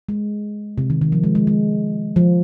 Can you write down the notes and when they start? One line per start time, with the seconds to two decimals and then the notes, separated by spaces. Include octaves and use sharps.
0.09 G#3
0.78 C3
0.90 D#3
1.02 D#3
1.12 F3
1.24 G#3
1.35 G#3
1.47 G#3
2.16 F3